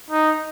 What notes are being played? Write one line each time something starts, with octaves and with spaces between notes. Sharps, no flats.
D#4